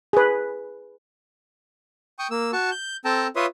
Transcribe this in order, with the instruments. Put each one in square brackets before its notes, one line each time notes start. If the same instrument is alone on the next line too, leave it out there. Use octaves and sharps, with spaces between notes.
[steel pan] G#4 B4
[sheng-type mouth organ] G5 C#6 D#6
A#3 E6
F#4 A5 C#6
G6
C4 A4 G5 A5 A#5
F4 B4 C#5 E5 C6 D#6